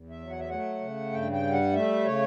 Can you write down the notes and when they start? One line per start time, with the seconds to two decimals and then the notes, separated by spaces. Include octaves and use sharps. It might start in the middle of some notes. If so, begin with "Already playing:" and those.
Already playing: E2
0.10 E5
0.20 F#3
0.30 F#5
0.39 E5
0.50 A3 F#5
0.81 C#3
1.12 G2 G5
1.32 G5
1.43 G3
1.53 F#5
1.74 A3 E5
2.05 C#3 C#5